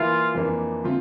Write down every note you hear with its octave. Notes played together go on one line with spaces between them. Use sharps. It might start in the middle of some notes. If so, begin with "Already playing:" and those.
Already playing: E3 A#3 E4 F4 A#4
F2 E3 A#3 D4
D3 F3 C4 F4